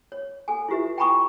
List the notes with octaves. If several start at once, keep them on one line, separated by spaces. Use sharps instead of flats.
C#5
A4 G#5
E4 F4 G4 B4 E5
G5 G#5 A#5 B5 C#6 D#6